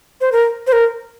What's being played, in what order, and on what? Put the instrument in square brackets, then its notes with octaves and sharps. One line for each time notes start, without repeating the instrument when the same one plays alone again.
[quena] C5
A#4
C5
A#4